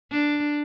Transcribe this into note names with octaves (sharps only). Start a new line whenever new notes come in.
D4